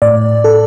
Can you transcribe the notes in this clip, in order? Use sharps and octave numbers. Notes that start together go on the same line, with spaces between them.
A2 D5
A4